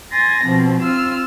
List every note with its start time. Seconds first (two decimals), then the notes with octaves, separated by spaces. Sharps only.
0.12 G#5 C6 A6 A#6
0.45 B2 F3 C4
0.82 C4 F4 E6 F6